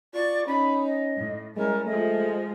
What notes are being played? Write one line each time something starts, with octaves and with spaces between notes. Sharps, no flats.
F4 D5 C#6
C#4 D#4 B5
D#5
A2
G3 G#3 C#4 E4 A#4
F3 G#3 A3 G#4 D#5